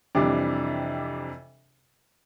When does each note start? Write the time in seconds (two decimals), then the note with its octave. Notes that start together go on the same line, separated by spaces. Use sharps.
0.15 F2 C3 E3 G3 D4